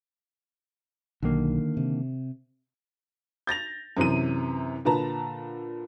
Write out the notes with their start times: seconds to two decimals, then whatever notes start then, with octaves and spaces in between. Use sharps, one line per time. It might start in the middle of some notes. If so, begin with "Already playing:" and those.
1.23 B1 D3 D#3 A#3
1.77 C3
3.47 G6 A6 A#6 F7
3.97 F#2 C3 E3 D#7
4.85 A#2 D3 B4 A5 A#5